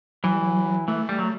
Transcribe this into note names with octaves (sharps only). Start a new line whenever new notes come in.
E3 F#3
G3
F#3
E3 A3
G3
F#3